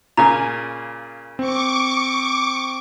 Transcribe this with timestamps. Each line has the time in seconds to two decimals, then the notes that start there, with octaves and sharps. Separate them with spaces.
0.17 A#2 C#3 G#5 A#5
1.39 C4 C#6 D6